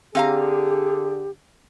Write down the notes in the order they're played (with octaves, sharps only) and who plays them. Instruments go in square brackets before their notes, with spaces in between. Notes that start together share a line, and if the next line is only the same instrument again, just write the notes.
[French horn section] D3 G#4 [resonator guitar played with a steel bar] C4 F5 A#5 [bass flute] G4